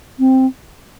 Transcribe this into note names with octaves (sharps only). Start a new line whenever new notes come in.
C4